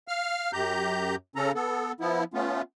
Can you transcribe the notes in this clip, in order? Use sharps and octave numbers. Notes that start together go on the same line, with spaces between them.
F5 F6
F#2 G4 A#5 G6
C#3 C#4 A4 A#5
B3 A4
F3 B3 E4
A3 B3 C#4 F4